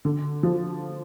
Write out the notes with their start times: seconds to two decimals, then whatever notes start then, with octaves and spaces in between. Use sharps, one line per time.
0.05 D3
0.43 F3